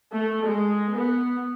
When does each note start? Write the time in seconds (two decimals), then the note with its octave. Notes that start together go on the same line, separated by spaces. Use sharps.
0.13 A3
0.45 G#3
0.92 B3